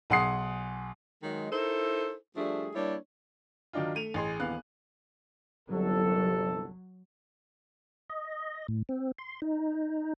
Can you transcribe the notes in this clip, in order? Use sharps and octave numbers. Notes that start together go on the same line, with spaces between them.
B1 G#4 F#5 C6 D#6 C7
D#3 F#3 G#3
D#4 E4 A4 A#4 C5
F3 G3 A3 D4 G#4
G3 A#3 D4 E4 C#5
D#3 F#3 D4 D#4 F4
A3 D#7 F7
A1 G#4 C6
D#1 E3 B3 F5 F#6
G1 C2 F#3 A4
D#5
A2
C4
C6
D#4